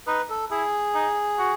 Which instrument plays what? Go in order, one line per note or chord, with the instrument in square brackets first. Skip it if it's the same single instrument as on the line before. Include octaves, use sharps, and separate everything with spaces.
[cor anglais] D#4 [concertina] B4
[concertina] A4
[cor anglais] E4 [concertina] G#4
[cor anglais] D#4
F#4